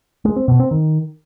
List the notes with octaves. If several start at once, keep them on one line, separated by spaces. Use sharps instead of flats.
G#3
C4
B2
C4
D#3